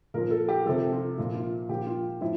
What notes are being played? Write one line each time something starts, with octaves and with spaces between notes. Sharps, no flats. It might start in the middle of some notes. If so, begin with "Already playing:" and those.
A#2 F3 A#4
A4
G4
C3 F3 A4
F4
A#2 F3
F4
A#2 F3 G4
F4
A2 F3 E4